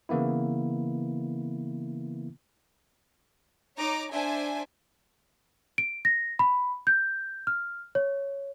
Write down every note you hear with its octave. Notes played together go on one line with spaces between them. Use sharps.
C#3 E3 A#3 B3 E4
D#4 C#5 A#5 D6
D4 C5 E5 G#5
D7
A#6
B5
G6
F6
C#5